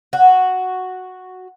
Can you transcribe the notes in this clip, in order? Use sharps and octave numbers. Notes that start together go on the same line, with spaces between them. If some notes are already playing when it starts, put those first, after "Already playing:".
F#4